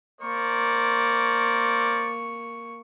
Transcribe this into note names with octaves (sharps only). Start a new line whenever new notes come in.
A#3 A#4 C5 D5 C#6